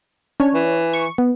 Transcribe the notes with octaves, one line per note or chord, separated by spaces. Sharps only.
C#4 D4 C#5
E3
C#6
B3